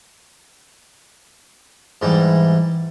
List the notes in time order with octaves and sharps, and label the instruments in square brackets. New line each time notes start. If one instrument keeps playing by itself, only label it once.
[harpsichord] G#2 E3 G3